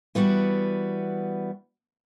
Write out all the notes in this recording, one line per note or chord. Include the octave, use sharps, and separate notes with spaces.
E3 G3 B3 F#4